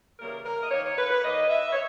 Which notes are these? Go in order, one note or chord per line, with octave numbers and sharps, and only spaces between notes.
C#3 E3 G3 A#3 A#4
A#4
D#5
D#3 A#3 C#5
C#5
B4
B4
D#3 A#3 D#5
E5
C#5